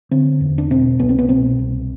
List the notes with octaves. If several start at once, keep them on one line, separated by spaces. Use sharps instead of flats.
D3 C4
E2
D4
B2 C4
C2 B3
C4
B3
B2 C4
C2